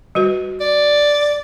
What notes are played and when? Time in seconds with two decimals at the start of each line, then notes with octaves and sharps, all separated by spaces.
0.15 G3 F#4 B4
0.60 D5